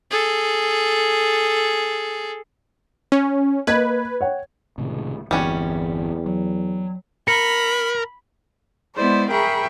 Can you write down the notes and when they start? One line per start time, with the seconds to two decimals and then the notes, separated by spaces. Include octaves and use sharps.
0.11 G#4 A4
3.12 C#4
3.67 A#3 B4 D#5 G#6
4.21 C#5 F#5 G5
4.78 C#2 A2 C3 D#3
5.31 G1 E2 E3 G3 C4 C#4 F#4
6.26 F#3
7.28 A#4 B5 C#7
8.95 G#3 B3 E4 C5 D5
9.29 G#4 A#4 E5 G5 B5 C#6